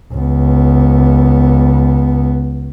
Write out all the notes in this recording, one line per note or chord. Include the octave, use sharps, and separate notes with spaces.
C#2 B3